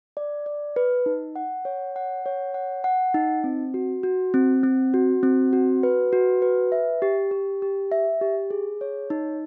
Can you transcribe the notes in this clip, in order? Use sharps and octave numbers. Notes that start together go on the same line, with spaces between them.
D5
D5
B4
D#4
F#5
C#5
F#5
C#5
F#5
F#5
D#4
C4
F#4
F#4
C4
C4
F#4
C4
F#4
B4
F#4
B4
E5
G4
G4
G4
E5
G4
G#4
C#5
D#4